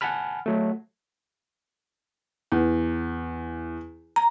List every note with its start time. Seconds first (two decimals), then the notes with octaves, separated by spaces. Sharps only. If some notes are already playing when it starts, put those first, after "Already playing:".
0.01 F#5 G#5 A5 B5 F6
0.46 F#3 A3
2.52 E2
4.16 A#5